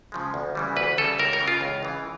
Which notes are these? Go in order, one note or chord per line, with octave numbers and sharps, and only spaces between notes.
C#3 F3 G#3
D2
C#3 E3 G3
D2 B4
C#3 E3 G3 A4
C#2 A#4
A#4
C#3 E3
F4
C#2
C#3 E3